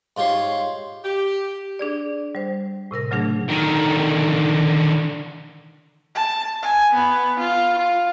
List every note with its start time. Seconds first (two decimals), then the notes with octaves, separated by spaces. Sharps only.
0.17 G#2 F4 G4 C#5 C6
1.04 G4
1.79 D4 G#4 D5
2.35 G3 C5
2.91 A2 C3 A#4 A#6
3.11 C#3 F#3 A3 D4 G#4
3.49 D3 D#3
6.15 A5
6.62 G#5
6.94 B3
7.39 F4
7.78 F4